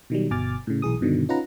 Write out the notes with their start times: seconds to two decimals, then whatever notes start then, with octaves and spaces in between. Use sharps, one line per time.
0.10 B2 D#3 F#3 G3
0.31 G1 B2 G#5 D6 F6 A6
0.67 A2 C#3
0.82 B1 E3 G#4 D#6
1.01 G2 B2 D3 D#3
1.29 C#4 D#4 F4 B4 F#5 A#5